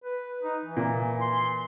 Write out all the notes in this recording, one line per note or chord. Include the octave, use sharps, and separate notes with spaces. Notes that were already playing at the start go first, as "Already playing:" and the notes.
B4
D#4
E3
A#2
C6